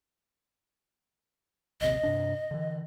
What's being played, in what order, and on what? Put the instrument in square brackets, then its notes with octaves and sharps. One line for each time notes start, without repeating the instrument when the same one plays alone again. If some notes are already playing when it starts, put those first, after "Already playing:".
[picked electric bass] A#1 D#2 C3 [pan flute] D#5
[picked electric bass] G2 C3 D4
D3 E3